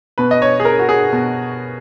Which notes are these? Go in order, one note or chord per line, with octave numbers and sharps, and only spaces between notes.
B2 B4
D#5
C#5
G#4
A#4
F#4
G#4
B2